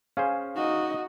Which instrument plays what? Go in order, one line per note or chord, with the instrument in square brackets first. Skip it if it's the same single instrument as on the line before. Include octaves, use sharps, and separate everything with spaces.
[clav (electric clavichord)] C#4 G#4 C5 [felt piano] F5
[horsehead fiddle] D#4 D#5 [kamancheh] F#4